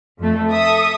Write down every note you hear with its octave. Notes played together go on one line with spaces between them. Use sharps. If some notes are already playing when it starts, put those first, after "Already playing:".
F2 A3
A4 E5 D#6